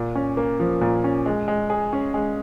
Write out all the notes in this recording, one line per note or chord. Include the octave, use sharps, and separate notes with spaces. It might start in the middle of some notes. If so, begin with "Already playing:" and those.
Already playing: A#2
C#4
A#3
F3
A#2
C#4
G#3
G#3
G#4
C#4
G#3